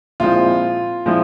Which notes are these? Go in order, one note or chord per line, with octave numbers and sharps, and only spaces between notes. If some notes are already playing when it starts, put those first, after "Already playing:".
A#2 F3 G#3 C4 E4 F4
A#2 F3 G#3 C4 E4